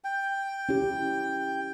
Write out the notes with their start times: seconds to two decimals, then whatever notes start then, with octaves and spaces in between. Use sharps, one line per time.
0.04 G5
0.69 C#4 E4 G4